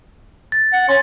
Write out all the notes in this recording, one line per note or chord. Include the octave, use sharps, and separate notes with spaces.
A6
F#5
C#4 C6 G#6 A6